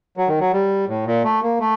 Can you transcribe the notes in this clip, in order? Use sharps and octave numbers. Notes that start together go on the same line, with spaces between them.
F#3
D#3
F#3
G3
A2
A#2
A3
A#3
A3